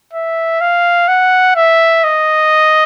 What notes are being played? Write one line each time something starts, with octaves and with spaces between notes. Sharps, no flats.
E5
F5
F#5
E5
D#5